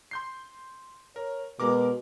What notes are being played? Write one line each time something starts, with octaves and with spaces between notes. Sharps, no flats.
C6 G6 C7
A#4 C#5
B2 G#3 A#4 D6